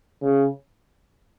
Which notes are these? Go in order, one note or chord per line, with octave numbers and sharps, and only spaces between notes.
C#3